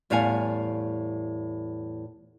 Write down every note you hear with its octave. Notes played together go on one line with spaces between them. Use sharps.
E2 A2 G3 F5 F#5 G#5